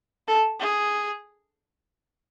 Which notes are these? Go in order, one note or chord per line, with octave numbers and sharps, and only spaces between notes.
A4
G#4